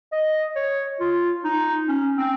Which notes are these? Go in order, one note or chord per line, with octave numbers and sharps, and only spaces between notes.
D#5
C#5
F4
D#4
C#4
C4